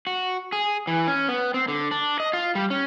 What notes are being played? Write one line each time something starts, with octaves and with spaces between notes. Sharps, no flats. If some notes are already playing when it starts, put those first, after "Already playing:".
F#4
G#4
E3
C#4
B3
C4
D3
D4
D#5
F4
G3
C#4